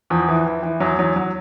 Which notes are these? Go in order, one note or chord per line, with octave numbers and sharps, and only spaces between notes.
E2 F3
E3
E3
E3
E2 F#3
E2 F#3
F#3